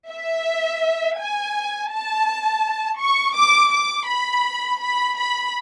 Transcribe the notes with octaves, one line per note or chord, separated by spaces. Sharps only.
E5
G#5
A5
C#6
D6
D6
B5
B5
B5